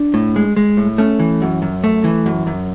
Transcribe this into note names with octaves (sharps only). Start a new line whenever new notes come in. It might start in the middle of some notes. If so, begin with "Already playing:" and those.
Already playing: D4
A2
G#3
G#3
A2
A3 C#4
E3
F#2
F#2
A3
E3
F#2
F#2